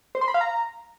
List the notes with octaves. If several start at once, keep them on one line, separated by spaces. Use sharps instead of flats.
C5
C6
B5
F5
A#5